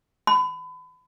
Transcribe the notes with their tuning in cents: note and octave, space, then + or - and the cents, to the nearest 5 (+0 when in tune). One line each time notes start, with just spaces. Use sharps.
B5 +35